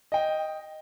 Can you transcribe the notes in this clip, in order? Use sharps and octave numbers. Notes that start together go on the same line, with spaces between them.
D#5 G5